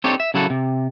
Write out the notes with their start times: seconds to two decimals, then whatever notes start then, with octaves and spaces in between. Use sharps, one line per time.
0.04 C4 D4 D#4 G4 A4 C#5
0.20 E5
0.34 C#3 F#3 E4 F#4 A4
0.50 C3